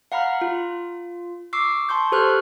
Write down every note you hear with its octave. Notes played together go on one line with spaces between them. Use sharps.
F5 F#5 A#5 B5 F6
F4
C#6 D6 E6 C7
A5 C6 C#6 G6
G4 A4 C5 C#6 F6 F#6